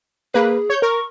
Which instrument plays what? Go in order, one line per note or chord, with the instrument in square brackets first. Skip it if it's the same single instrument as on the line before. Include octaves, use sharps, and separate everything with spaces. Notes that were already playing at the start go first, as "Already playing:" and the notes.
[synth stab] A#3 B4 [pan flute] G#4
[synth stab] C#5 G6
[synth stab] A#4 [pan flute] C#6